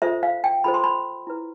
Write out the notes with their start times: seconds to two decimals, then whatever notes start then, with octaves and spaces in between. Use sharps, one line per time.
0.02 F4 A4 C5 E5
0.23 F5
0.44 G5
0.64 F4 A4 C5 B5
0.74 C6
0.84 B5
1.27 E4 B4